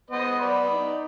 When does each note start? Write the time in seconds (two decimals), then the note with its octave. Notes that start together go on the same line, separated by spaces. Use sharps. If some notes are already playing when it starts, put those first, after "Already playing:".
0.10 B3 C5 D#5
0.40 B4 D5
0.71 D#4